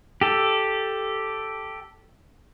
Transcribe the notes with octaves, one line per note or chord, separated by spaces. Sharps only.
G4 A4